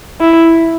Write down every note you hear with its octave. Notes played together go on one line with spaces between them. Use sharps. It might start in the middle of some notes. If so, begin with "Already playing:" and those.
E4